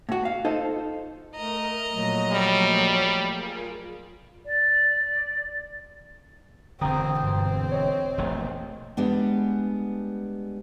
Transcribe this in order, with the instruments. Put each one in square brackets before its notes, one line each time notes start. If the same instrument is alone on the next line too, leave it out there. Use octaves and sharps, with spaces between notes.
[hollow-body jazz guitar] A2 F#4
F5
D#4 F4 A4 C5 D#5
[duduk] A3 [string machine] A#4 [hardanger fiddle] D#5 A#5
[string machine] A#2 F3 A3 [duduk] F#3
[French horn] G3
[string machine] F4 G#4 A#4
[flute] D5
[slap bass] E1 D3 [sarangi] C4 [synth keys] G5 A#5 D#6
[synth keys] G2 [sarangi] C4
[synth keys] C#5 D#5
[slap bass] E1 A#1 A3
[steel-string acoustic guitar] G3 G#3 B3 D4